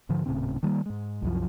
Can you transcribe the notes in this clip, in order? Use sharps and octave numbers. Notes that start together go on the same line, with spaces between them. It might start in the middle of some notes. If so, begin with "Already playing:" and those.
G#2 D3 F3
D#1 A2 C#3 C4
D#3 G3 A#3
G#2 G#3
C2 F#2 F3